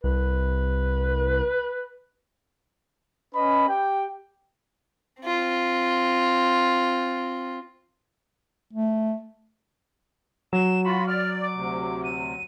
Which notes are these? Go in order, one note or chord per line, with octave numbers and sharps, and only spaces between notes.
C2 B4
C#4 B4 D#5 B5
G4 G5
C4 F4
A3
F#3 E7
F4 F#4 B5
D5 F6
D6
D2 C3
D#7